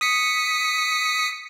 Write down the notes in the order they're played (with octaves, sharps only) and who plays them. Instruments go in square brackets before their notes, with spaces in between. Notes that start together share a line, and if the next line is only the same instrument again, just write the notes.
[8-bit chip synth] D#6 B6 C#7